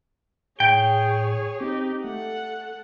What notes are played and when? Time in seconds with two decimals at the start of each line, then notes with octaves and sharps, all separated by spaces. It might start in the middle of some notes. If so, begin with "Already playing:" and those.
0.60 A2 G#4 C#5 G5
1.61 C4 D#4 G4
2.04 A3 A4 F#5